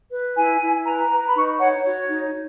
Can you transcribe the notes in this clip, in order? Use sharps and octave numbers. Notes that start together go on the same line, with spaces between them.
B4
E4 G#5
E4
B4 A#5
B4
A#5
B5
D#4 C#6
C#5 F#5
F#4 C#5
D#4